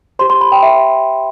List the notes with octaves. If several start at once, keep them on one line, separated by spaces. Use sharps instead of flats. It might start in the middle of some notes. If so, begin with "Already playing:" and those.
G4 C5 C6
C6
B5
G5
E5